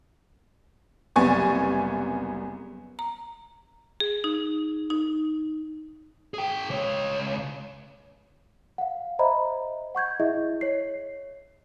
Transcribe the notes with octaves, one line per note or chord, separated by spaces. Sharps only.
F#1 C2 B3 G#5 C#6 A6
A#5
G#4
D#4
D#4
G#4 G5
C#2 C#5
F5 F#5
C5 D#5 E5 A#5 B5
F#5 C#6 G6 G#6
E4 G#4 D#5 E5
C#5 C7